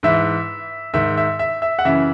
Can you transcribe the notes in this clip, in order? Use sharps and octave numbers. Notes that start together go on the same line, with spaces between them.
G#2 E3 E5
G#2 D#3 E5
E5
E5
E5
F#5
F#2 C#3 E3 E5